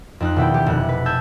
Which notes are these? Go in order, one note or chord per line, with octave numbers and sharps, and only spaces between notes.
F2 D#4 F#6
D#1 B2 E4 G5
G4
F1 F#6
B4
A5 E6 G6 G#6